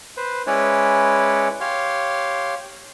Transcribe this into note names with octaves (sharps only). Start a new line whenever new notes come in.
B4 C5
G#3 C#4 E4 B4 C#5 D5
G4 C#5 F5 C6